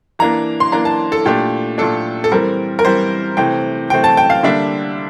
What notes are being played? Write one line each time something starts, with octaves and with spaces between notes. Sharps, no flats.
E3 A#3 D4 A#5
C6
E3 A#3 D4 A#5
A5
A4
A#2 A3 D4 G4
A#2 A3 D4 A4
A4
E3 G3 C4 A#4
A#4
E3 G3 C4 C5
C3 E3 A3 C4 G5
C3 E3 A3 C4 G5
A5
G5
F5
D3 G3 A#3 D4 E5